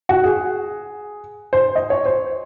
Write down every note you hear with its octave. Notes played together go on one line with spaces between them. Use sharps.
F#4
G#4
C5
D#5
C#5
C5